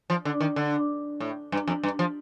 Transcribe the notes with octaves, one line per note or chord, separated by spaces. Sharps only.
F3
D3
D#3
D3
A2
G2
F2
G2
F3